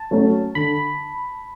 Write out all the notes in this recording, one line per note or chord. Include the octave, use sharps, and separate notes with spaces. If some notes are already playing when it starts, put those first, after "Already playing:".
Already playing: A5
F#3 A3 C#4
D3 B5